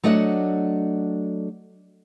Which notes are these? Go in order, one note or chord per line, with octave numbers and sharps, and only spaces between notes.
F#3 A3 D4 D#5 F5 F#5